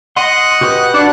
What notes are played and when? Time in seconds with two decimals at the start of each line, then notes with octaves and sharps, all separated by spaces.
0.17 D#5 F#5 C6
0.61 F#4 G4 B4
0.94 D4